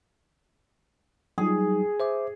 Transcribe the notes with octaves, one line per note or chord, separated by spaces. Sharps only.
F#3 G3 D#4 G#4
C5 E5 D6